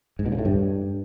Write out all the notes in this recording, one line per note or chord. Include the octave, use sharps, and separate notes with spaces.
G#2
B2
C#3
A2
G2